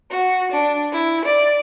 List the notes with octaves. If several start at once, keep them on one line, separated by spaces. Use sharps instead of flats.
F#4
D4
E4
D5